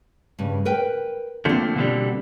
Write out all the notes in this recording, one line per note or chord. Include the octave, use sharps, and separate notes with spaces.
G2 C#3
A#4 B4 G5
D3 F3 A3 A#3 C4
B2 D3 G3